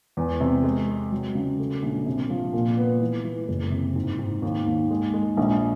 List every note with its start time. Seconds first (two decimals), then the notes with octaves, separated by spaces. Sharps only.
0.17 E2
0.41 C3
0.64 G#3
0.88 G#3
1.12 F#3
1.35 C#3
1.59 A3
1.82 A#1
2.06 C3
2.30 F3
2.53 A#2
2.77 B3
3.01 E3
3.24 E3
3.48 F#1
3.72 C3
3.95 G#2
4.19 G#2
4.42 D#2
4.66 D#2
4.91 G#3
5.14 G#3
5.37 A#1